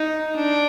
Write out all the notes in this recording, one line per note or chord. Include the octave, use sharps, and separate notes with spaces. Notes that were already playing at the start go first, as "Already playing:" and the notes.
Already playing: D#4
D4